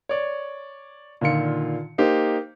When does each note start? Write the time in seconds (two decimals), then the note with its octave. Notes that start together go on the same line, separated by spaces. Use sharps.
0.09 C#5 D5
1.21 A#2 D3 D#3 F4 C#7
1.98 A#3 D#4 G4 C5